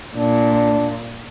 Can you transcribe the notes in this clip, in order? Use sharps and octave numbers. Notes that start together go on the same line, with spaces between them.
A#2 D4